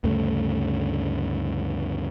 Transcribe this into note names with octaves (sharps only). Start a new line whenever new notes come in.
D2 G2 C#3 A3